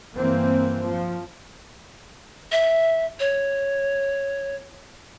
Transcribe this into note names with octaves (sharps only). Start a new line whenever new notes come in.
G2 E3 A#3 C4
F3
E5
C#5